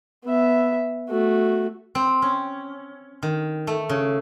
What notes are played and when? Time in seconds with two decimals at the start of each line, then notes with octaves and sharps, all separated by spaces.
0.24 B3 E5
1.09 A3 F#4
1.95 C4
2.22 C#4
3.23 D#3
3.67 A3
3.89 C#3